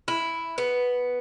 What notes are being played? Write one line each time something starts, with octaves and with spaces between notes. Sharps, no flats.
E4
B3